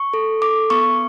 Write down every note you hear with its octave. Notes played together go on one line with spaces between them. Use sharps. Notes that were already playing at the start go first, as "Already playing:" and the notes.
Already playing: C#6
A4
A4 D6
B3 C#6